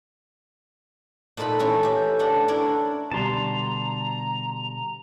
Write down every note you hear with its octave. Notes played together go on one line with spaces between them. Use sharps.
A#2 A3 D#4 A4 B4 B5
E3 A3 C#4
G4 E5
A3 D4 F#5
D4 E4 A#4 C#5
B2 D3 G3 A5 A#5 C6